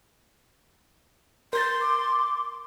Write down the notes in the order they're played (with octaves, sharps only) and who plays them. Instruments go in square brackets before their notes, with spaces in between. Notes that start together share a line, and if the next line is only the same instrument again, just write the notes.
[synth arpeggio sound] A#4 G6 A6 [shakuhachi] C6
[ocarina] D6